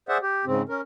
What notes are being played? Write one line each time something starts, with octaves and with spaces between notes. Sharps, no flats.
G#4 C5 D5 E5 F#5
G4
G#2 C#3 C4
C#4 A#4